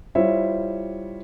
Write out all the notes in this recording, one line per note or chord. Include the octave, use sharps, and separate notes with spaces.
G3 E4 F4 C5 C#5 E5